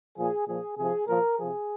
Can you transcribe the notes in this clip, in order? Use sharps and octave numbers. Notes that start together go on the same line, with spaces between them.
A#2 F3 G#4
A#2 F3 G#4
C3 F3 G#4
A#2 F3 A#4
C3 F3 G#4